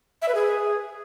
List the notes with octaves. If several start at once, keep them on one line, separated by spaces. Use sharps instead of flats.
E5
B4
G#4